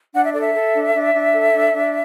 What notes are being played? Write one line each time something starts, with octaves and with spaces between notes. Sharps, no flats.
D4 F#5
E5
A4 D5
E5
A4
D4
D4
D4
A4
D4
D4